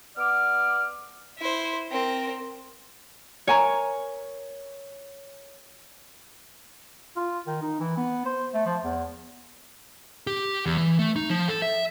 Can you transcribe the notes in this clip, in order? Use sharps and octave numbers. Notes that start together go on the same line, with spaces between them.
B3 D5 D6 F6
E4 C5
C4 A#4
A#4 C#5 G#5 A#5
F4
D#3
D#4
E3
B3
C5
A3
F3
E2
G4
E2
E3
A3
D#4
F3
A4
E5